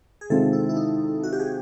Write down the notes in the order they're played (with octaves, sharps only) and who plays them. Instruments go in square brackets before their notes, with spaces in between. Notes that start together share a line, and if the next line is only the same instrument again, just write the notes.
[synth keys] G#4
[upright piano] C3 D#3 G#3 C4 F4 [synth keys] A4
[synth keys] E4
E4
D#4
F#4
G4
G#4